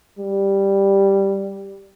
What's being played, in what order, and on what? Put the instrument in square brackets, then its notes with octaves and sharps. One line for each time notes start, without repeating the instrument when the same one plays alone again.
[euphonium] G3